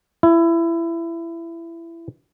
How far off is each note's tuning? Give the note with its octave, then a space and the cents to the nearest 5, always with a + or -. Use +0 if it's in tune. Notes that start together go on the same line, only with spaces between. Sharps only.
E4 +20